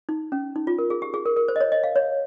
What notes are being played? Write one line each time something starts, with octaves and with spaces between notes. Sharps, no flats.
D#4
C#4
D#4
F4
A#4
G#4
G4
G#4
A#4
A#4
C5
D#5
C#5
D#5
F5
C#5